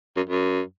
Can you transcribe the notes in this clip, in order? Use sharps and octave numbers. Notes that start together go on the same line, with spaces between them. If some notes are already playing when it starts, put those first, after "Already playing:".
F#2
F#2